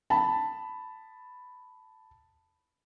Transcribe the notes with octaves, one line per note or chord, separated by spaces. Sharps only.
A5 B5